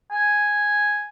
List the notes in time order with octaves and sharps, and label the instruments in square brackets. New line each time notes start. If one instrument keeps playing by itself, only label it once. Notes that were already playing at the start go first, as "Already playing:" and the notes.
[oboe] G#5